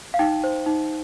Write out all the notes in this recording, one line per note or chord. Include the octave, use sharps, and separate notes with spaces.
F5
D#4 G5
C5
D#4